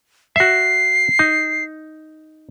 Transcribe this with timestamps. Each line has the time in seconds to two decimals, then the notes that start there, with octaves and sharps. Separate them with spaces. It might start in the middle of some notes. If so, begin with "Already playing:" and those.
0.36 F#4 E5 C7
1.19 D#4